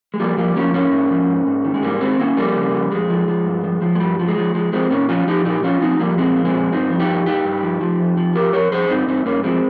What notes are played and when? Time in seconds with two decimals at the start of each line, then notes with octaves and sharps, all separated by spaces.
0.14 G#3
0.20 F3 G3 A#3
0.37 F3 G3 A#3
0.56 F3 A#3 C#4
0.74 G#2 A#3 C#4
0.92 G#2
1.10 F3
1.29 G#2
1.47 G#2
1.64 D#3
1.74 G#3
1.83 G#2 G3 A#3
2.01 D#3 G#3 C4
2.19 D#3 A#3 C#4
2.37 F2 G3 A#3
2.56 C#3
2.74 F2
2.92 F2 G#3
3.10 F3
3.28 F3
3.46 G2
3.64 F3
3.82 F3
3.95 G#3
4.00 G2 G3
4.19 F3
4.28 G#3
4.37 F3
4.55 F3 G#3
4.73 F3 G#3 C4
4.90 A#2 A#3 C#4
5.09 F3 C#4 F4
5.27 F3 D#4 G4
5.45 A#2 D#4 G4
5.63 F3 C#4 F4
5.81 F3 C4 D#4
6.00 F3 G3 A#3
6.18 A#2 G#3 C4
6.36 F3
6.45 G#3 C4
6.54 A#2
6.73 G2 C4 D#4
6.90 F3
7.00 D#4 G4
7.08 G2
7.26 G2 D#4 G4
7.44 G2
7.62 F3
7.81 F3
8.00 F2
8.17 F3
8.35 F2 G4 A#4
8.53 F2 A#4 C#5
8.71 F2 G#4 C5
8.89 G2 C4 D#4
9.08 G2 C4 D#4
9.25 G2 A#3 C#4
9.43 F3 G#3 C4